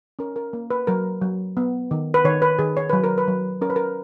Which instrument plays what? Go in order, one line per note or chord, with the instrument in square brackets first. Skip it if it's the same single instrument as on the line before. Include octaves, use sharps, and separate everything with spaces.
[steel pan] C#4 A#4
A#4
A#3
B4
F#3 A#4
F#3
B3
D#3
B4
D#3 C#5
B4
D#3 G#4
C#5
F#3 B4
A#4
B4
F#3
C#4 A#4
B4
A#4